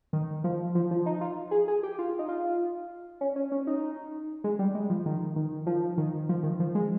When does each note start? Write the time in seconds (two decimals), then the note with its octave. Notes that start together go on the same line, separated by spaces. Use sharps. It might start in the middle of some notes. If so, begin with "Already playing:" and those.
0.13 D#3
0.44 F3
0.75 F3
0.91 F3
1.06 D#4
1.21 F4
1.51 G#4
1.68 G#4
1.83 G4
1.99 F4
2.19 D#4
2.29 F4
3.21 C#4
3.36 C#4
3.52 C#4
3.67 D#4
4.44 G#3
4.59 G3
4.75 G#3
4.90 F3
5.06 D#3
5.36 D#3
5.67 F3
5.98 D#3
6.29 F3
6.43 D#3
6.60 F3
6.75 G#3